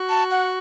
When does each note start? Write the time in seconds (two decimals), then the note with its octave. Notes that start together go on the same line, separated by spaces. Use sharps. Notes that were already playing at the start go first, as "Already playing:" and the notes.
Already playing: F#4
0.09 A5
0.31 F#5